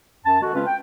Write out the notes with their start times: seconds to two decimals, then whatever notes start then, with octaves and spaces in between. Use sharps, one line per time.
0.24 F#2 A5
0.41 D3 G#3 F#4
0.54 C#3 G#3 C4 C#4 F4 B4
0.66 G5